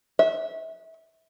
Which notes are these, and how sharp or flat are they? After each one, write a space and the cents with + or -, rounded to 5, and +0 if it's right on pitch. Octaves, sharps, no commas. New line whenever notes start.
E5 -25